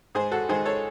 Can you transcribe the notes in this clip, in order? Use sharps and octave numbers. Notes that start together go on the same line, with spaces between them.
G#2 G#4 C5
F#4 A4
D#3 G#3 G#4 C5
A4 C#5